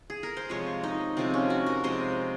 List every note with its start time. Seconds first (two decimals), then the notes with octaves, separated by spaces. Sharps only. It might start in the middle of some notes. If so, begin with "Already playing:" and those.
Already playing: F#4
0.10 G#4
0.23 A#4
0.37 C5
0.49 C3 F3 G#3 C#5
0.84 D#4
1.17 C3 F3 G#3 C4
1.34 C#4
1.50 F#4
1.67 A#4
1.84 C3 F3 G#3 C5